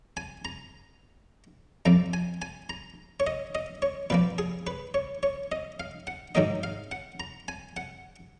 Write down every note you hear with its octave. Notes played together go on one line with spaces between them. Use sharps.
G#5
A#5
F2 F3 A#3 A#5
G#5
G#5
A#5
C#5
D#5
D#5
C#5
A#2 F3 A#3 B4
G#4
B4
C#5
C#5
D#5
F5
F#5
G#2 D#3 F#3 A#3 D#5
F5
F#5
A#5
G#5
F#5